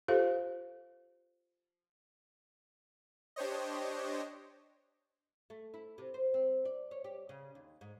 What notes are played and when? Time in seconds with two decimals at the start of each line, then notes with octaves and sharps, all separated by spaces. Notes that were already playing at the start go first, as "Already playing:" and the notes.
0.08 F4 G4 A4 C5 F5
3.36 D4 G4 C5 C#5 D#5
5.50 A3
5.74 E4
5.98 C3
6.14 C5
6.34 C4
6.65 D5
6.91 C#5
7.04 G4
7.29 C#3
7.55 D#2
7.81 G#2